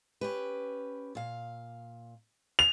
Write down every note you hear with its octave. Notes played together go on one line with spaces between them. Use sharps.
C#4 G4 B4
A#2 F5
F7